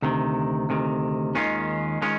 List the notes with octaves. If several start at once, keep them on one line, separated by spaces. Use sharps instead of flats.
D2 C3 D#3
D2 C3 D#3
D#2 D#3 G#3 C#4 F4
D#3 G#3 C#4 F4